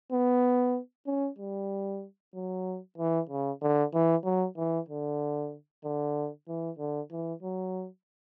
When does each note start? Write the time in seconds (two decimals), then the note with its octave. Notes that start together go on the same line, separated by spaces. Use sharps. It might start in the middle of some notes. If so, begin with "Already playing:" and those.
0.12 B3
1.07 C#4
1.39 G3
2.34 F#3
2.98 E3
3.30 C#3
3.62 D3
3.94 E3
4.24 F#3
4.57 E3
4.89 D3
5.84 D3
6.48 E3
6.79 D3
7.11 E3
7.43 F#3